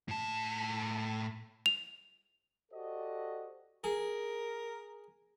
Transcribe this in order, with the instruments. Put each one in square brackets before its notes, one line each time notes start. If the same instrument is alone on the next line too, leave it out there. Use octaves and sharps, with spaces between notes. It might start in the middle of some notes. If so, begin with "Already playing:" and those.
[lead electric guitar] A2 A5
[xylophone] F7
[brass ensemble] F#4 G4 A4 C5 D5 D#5
[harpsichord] G#4 [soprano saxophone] A#4